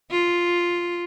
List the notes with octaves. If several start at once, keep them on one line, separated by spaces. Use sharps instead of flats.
F4